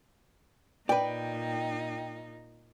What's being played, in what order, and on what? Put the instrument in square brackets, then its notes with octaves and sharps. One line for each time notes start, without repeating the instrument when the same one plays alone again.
[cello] A#2 D#4 [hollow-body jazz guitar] B4 D5 [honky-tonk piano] G5